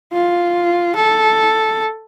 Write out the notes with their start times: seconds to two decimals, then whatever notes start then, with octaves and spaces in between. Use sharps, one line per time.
0.13 F4
0.96 A4